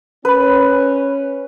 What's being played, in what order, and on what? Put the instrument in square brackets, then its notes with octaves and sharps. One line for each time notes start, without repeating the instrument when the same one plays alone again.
[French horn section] C#4 [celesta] A#4 B5 [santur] B4